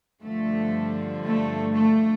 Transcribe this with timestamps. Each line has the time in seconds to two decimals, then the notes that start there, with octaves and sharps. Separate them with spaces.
0.22 G2 D3 F3 A3
1.23 A3
1.74 A3